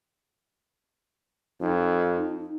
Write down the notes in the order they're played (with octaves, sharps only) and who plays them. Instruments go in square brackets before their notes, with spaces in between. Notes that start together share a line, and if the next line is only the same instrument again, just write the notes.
[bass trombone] F2 [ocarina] D#4